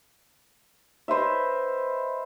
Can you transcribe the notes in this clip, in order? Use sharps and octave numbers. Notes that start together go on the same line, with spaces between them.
B4 C5 D#5 E5